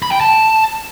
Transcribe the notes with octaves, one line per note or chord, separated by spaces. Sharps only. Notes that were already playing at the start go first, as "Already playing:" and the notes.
B5
G5
A5